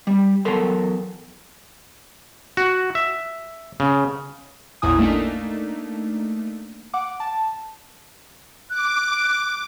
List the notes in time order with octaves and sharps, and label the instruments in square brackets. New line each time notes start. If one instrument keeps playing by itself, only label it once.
[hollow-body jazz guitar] G3
E2 F#3 A4 A#4 C6
[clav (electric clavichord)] F#4
E5
C#3
[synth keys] A1 E2 A#2 E4 G#5 D#6
A3 A#3 D4 D#4
F#5 D6
A5
[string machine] D6 [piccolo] F#6